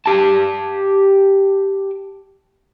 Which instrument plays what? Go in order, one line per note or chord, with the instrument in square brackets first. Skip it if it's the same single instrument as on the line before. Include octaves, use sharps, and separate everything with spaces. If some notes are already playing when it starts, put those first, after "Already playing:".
[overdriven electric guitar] G4 A5